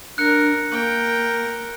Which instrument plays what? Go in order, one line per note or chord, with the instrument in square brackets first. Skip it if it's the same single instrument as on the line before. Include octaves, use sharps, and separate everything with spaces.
[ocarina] D4 [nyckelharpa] A#4 [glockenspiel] F#6 C#7
[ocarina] A#3 [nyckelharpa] A#4 G5